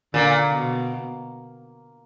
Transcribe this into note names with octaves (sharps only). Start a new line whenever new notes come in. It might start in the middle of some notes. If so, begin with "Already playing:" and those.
A#2 D3
B2